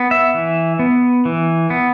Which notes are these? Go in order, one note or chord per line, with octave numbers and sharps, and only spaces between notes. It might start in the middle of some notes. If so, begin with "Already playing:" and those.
Already playing: B3
E5
E3
B3
E3
B3